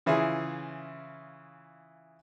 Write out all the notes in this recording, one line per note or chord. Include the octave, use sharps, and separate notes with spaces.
C#3 E3 E4 F4 G#4